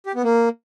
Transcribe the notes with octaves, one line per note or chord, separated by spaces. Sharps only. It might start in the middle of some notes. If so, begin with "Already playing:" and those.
G4
B3
A#3